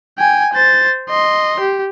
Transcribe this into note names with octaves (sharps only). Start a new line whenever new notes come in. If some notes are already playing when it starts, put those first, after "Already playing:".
G5 G#5
C5 A6
D#5 C6
G4